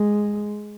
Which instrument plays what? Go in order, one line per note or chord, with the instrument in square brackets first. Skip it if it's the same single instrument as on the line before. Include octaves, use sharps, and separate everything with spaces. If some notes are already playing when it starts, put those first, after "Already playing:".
Already playing: [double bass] G#3